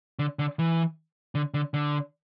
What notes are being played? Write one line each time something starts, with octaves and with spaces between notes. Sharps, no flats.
D3
D3
E3
D3
D3
D3